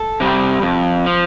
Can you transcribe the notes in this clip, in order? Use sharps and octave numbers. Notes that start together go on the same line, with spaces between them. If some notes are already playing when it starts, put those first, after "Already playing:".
Already playing: A4
C3 G3
F2
F3